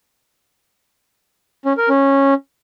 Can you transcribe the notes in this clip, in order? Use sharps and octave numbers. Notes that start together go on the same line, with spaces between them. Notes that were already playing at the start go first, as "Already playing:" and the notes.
C#4
A#4
C#4